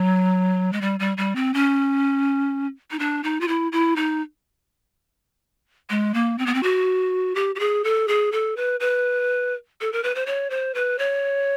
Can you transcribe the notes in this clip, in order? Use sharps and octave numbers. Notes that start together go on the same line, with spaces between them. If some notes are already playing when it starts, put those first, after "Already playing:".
Already playing: F#3
G#3
G3
G3
G3
C4
C#4
D#4
D4
D#4
F4
E4
E4
D#4
G#3
A#3
C4
B3
C4
F#4
G4
G4
G#4
A4
G#4
A4
B4
B4
A4
A#4
B4
C5
C#5
C5
B4
C#5